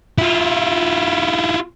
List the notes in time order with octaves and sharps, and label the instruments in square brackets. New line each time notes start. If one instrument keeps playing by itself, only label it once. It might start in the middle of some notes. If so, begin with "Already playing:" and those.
[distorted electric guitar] E4 F4